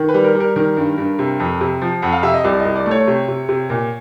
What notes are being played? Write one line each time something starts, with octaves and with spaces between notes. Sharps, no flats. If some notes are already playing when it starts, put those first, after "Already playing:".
Already playing: D#3
B4
G3
A#4
G3
A#4
D#3 A#4
G2
G2
C3
F2
C3
F3
F2 F#5
F5
C3 E5
D#5
C2 D5
D#5
C2
D5
A3
C#5
C3
C3
C3
A#2